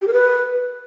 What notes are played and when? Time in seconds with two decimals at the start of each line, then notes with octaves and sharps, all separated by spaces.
0.02 G4
0.07 A#4
0.13 B4